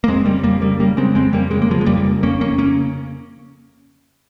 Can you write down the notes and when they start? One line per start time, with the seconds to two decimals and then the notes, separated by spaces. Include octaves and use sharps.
0.04 A#3
0.08 F2 G#3 C4
0.25 C#3 G3 A#3
0.44 F2 G3 A#3
0.61 C#3 G3 A#3
0.79 C#3 G3 A#3
0.97 C#3 G#3 C4
1.15 F2 G#3 C4
1.33 F2 G3 A#3
1.51 C#3 G#3
1.62 A#3
1.69 C#3 F3 G#3
1.81 G#3
1.86 F2 G3 A#3
2.05 C#3
2.23 F2 A#3 C#4
2.41 F2 A#3 C#4
2.58 C#3 A#3 C#4